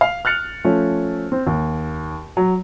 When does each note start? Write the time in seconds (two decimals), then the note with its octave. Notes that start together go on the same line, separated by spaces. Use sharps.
0.01 F5
0.25 F6 F#6 A6 C#7 F7
0.64 F3 A3 C#4
1.32 C4
1.47 D#2
2.37 F#3